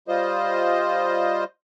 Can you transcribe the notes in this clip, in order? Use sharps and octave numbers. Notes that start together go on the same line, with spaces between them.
G3 F4 C5 D#5